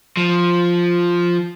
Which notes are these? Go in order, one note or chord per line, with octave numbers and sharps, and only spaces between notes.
F3